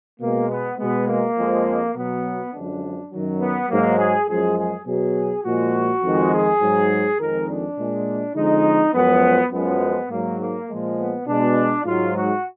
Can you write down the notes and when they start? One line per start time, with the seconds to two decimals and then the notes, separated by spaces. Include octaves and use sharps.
0.20 B2 G#3 A#3
0.50 B3
0.79 B2 G#3 B3
1.08 A#3
1.37 F2 F3 G#3
1.95 B2 F#3 B3
2.53 F#2 D3 F3 G#3 D4
3.12 F#2 D#3 F#3
3.40 B3
3.70 G#2 F#3 A#3
3.99 G#4
4.28 F#2 F3 G#3 G#4
4.57 G#4
4.86 B2 F#3 G#4
5.44 A#2 F3 G#3 F#4
6.03 F2 D#3 G#3
6.32 G#4
6.61 G#2 F#3
7.20 F2 D#3 G#3 A#4
7.49 D4
7.78 A#2 G#3
8.36 F2 D3 F3 G#3 D#4
8.94 F#2 F3 G#3 B3
9.52 F#2 F3 G#3 B3
10.10 G#2 F#3 A#3
10.39 A#3
10.69 A#2 F3 G#3
10.98 B3
11.27 B2 G#3 D4
11.85 G#2 F#3 F4
12.15 F#4